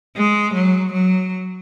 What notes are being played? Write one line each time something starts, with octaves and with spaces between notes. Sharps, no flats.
G#3
F#3
F#3